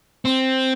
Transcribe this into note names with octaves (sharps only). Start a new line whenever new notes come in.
C4